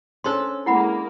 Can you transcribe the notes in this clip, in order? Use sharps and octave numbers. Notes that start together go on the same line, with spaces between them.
C#4 D4 A4 C5 C6
G#3 A#3 E4 F#5 B5